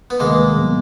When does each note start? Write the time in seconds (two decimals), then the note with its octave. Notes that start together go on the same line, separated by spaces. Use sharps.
0.10 B3
0.20 D2 C3 D#3 G3 G#3 A#3
0.57 A2 F#3 B3